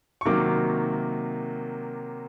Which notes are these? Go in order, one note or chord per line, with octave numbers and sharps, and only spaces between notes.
C#6
C3 D#3 F#3 A#3 D6